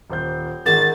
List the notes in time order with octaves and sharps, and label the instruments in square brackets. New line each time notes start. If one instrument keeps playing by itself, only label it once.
[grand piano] D#1 C5 G6
[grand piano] G#1 D#3 [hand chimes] G#4 A#4 F#5 [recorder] A6